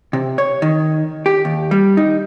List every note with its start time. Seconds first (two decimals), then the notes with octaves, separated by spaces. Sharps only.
0.13 C3
0.38 C#5
0.62 D#3
1.26 G4
1.45 D#2
1.71 G3
1.97 D#4